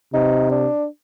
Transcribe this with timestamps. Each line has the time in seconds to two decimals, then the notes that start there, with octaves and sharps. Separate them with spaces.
0.13 C3 D#4
0.51 D4